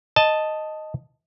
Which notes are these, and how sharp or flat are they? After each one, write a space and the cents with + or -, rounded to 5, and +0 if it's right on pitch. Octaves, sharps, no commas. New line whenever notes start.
D#5 +0 A5 +0